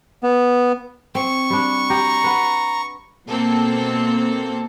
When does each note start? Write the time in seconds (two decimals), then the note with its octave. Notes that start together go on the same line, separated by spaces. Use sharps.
0.23 B3
1.15 C4 C#6
1.50 G3 D4
1.90 G4 A#5
2.24 B4 F#5
3.28 B2 A#3 C4 A4